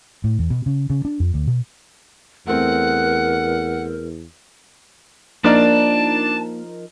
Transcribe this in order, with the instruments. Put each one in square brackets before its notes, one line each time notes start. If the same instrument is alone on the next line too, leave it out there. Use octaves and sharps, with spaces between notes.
[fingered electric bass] A2
E2
B2
C#3
C#3
D4
F2
D2
B2
[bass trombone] E2 [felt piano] A3 C4 [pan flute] A#4 [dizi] F#5
[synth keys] F3 D#4 A#4 [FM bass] A#3 [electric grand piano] D4 D5 [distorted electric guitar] A5